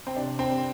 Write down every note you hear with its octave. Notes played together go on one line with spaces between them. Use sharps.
C4
C3 D4
C4
G3